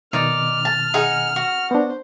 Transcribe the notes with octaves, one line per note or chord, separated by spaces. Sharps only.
B2 D#3 D#4 D5 F6
A5
D#4 G#4 F#5
F#4
B3 D4 C5